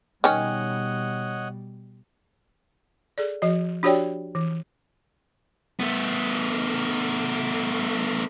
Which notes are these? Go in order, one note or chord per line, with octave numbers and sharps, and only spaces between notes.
B2 D#3 G3 C#4 C#5 D#5 F#5
G#4 A4 D5
F3 F#4 D#5
D4 F#4 G4 C#5 D5 G5
E3
A3 B3